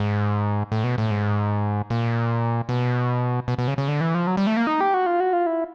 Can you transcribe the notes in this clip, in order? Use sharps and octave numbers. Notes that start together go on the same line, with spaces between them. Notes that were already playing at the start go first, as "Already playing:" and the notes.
Already playing: G#2
A2
B2
A2
G#2
A#2
B2
B2
B2
C#3
C#3
D3
E3
F3
F#3
G3
A3
A#3
D#4
G4
F#4
F4
F#4
F4
E4